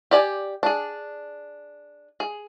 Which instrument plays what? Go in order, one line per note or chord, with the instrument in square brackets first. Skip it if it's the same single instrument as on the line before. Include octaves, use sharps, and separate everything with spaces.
[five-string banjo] G4 D5 G#5
D4 G#4
G#4